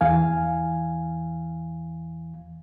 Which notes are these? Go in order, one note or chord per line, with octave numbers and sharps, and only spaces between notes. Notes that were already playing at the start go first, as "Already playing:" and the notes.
E2 E3 F5 G#5